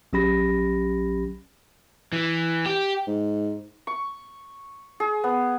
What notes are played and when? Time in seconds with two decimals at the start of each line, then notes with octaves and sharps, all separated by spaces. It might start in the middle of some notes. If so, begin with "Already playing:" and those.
0.13 A#1 F#3 C#4 G4 B5 A#6
2.13 E3
2.66 G4
3.07 G#2
3.87 C#6
5.00 G#4
5.24 B3